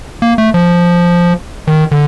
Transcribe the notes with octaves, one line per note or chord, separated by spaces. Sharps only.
A#3
A3
F3
D#3
D3